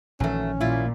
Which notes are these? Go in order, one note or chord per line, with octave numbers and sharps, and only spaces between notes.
A#1 D#3 E3 F#3 A3 C#4
A#2 E4 F4